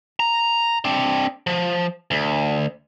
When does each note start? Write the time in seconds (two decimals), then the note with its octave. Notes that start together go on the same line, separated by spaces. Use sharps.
0.20 A#5
0.85 C4 D4
1.47 F3
2.11 D2